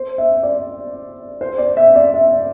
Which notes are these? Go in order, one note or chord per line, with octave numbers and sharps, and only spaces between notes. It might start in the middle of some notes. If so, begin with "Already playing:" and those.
Already playing: C5
E5
D5
C5
D5
E5
D5
E5